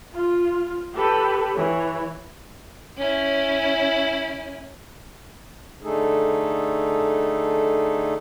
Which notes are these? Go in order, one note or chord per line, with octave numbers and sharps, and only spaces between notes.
F4
G4 A4 B4
E3 C#5
C#4 E4
D3 A3 D#4 G#4 A4